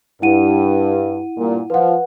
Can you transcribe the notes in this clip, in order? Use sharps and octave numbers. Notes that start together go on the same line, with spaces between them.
G2 E4 F#5 D#7
G2 A#2
F3 B4 F#5